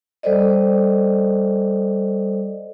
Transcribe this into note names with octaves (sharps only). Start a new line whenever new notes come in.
G3 A4 C5 D5 D#5